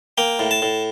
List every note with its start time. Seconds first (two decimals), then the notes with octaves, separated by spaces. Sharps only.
0.18 A#3 G5
0.39 A2
0.51 A5
0.62 A2